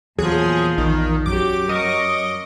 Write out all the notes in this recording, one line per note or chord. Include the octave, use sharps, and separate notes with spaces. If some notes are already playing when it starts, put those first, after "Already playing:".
E2 A#2 F3 F#3 G#4
A#1 D#3
F#2 F#3 G4 D6
F#3 A#4 D#5 C#6 D6